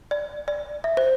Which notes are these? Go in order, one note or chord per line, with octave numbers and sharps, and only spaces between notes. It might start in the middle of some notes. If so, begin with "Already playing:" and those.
D5
D5
E5
C5